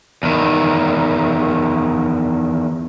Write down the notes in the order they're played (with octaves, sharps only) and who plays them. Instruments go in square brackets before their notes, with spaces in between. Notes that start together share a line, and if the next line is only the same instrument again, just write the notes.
[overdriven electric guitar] E2 D#3